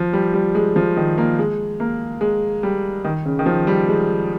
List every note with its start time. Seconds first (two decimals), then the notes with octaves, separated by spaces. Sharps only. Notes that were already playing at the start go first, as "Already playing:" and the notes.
Already playing: F3
0.13 G3
0.34 G3
0.55 G#3
0.76 F3
0.97 D#3
1.18 A#3
1.39 G#3
1.80 A#3
2.21 G#3
2.63 G3
3.04 D#3
3.25 C#3
3.39 D#3
3.46 F3
3.67 G3
3.88 G#3